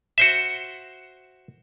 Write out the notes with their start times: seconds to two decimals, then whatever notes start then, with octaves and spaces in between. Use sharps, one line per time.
0.18 F#4 C5 E5